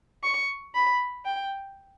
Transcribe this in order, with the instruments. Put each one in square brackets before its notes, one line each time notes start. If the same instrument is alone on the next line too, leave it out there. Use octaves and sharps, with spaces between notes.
[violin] C#6
B5
G5